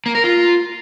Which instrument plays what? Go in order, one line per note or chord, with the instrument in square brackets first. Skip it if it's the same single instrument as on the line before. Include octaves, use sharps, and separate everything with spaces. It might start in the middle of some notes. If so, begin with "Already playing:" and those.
[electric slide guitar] A#3
A#4
F4